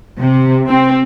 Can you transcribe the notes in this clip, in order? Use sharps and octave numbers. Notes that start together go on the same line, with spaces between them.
C3
C4